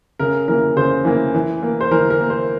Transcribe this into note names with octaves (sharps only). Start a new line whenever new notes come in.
C#3 A#4
E3 A#3 A#4
C#3 C5
E3 A#3
E3
A#3
C5
E3 A#4
A#4
A#3
C5